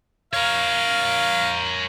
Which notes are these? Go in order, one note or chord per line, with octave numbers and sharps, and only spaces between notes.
A#4 C#5 F5